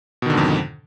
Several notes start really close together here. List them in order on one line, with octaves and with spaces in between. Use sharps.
B2 D#3 D3 G#2 F2